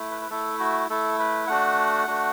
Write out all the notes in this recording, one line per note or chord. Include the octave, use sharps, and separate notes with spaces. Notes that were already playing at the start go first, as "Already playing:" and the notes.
Already playing: A3 E4
B4
B4
A3 E4 A4
F#4
A3 E4 A4
B4
A3 D4 F#4 F#5
A3 D4 F#4